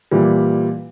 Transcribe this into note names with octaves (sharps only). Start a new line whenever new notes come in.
A#2 E3 G3